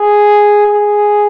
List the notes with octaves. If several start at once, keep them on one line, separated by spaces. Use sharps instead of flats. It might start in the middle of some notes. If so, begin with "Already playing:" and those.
Already playing: G#4
G#4